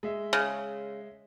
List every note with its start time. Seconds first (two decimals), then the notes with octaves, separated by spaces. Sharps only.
0.03 G#3 E5
0.33 C#3